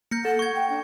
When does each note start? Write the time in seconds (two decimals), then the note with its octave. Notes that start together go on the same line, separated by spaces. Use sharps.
0.11 A#3 G6 A#6 C#7
0.25 A4 F#5
0.39 C#6 G#6
0.54 G5
0.70 D4